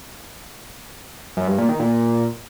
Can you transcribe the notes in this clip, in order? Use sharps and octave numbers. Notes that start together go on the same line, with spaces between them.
F#2
G2
A#2
D#3
A#2